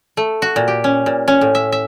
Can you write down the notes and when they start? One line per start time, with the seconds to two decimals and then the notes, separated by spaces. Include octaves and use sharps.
0.17 A3
0.42 F#4
0.56 A#2
0.68 G4
0.84 C#4
1.06 A#2
1.28 C#4
1.41 A2
1.55 E5
1.72 E5